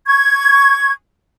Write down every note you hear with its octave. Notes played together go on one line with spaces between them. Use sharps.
C#6 G#6